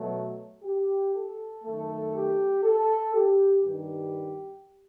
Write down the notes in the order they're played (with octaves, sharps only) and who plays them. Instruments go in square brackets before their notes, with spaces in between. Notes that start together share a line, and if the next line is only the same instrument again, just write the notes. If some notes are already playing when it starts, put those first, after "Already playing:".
Already playing: [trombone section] B2 F#3 A3
G4
A4
F#2 D#3 A3
G4
A4
G4
G2 D#3 G3 G4